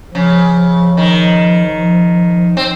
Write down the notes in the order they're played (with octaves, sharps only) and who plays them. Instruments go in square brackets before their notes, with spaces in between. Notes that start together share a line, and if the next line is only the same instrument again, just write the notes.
[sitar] C#3 [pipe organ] F3
[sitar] D#3
[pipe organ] F3
[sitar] C4